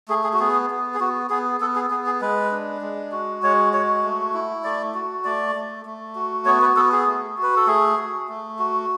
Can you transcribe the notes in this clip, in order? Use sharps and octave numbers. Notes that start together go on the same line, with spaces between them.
A3 G#4
G#4
F#4
B3 G#4
B3
G#4
B3 F#4
B3 G#4
B3 A4
G#4
B3 G#4
G#4
G#3 B4
D4
G#3
F#4
G#3 C#5
F#4 C#5
A3
E4
A3 D5
F#4
A3 D5
A3
A3
F#4
B3 C#5
B4
B3 A4
G#4
A3
F#4 B4
A4
A3 G#4
F#4
A3
F#4